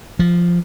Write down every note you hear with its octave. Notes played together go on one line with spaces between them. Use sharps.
F3